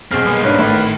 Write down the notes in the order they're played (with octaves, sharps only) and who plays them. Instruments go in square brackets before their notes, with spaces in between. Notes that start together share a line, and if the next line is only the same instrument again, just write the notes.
[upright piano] B1 G#4 F6 [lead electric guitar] C4
[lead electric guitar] G3 A#3 [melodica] G#3 B3
[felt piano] G#2 C#4 D4 [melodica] B4 F5
[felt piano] G#1 [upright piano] A2 [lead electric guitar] E4 A4